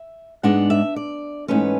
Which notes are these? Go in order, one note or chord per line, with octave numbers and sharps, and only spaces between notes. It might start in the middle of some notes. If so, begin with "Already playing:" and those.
Already playing: E5
G#2 G#3 B3 D4 F#5
E5
D5
G#2 E3 A3 C#4 B4